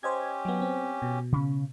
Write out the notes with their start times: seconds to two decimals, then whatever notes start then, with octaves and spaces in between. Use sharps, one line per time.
0.03 C#4 G4 C5 D#5 G#6
0.45 F#3 B3
0.62 C4
1.02 B2
1.32 C#3 C#4